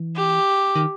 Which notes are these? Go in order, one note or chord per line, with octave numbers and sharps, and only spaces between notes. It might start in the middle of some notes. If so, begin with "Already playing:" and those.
Already playing: E3
G4
D#3